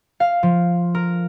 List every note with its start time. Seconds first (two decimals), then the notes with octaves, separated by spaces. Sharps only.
0.20 F5
0.43 F3
0.95 A#4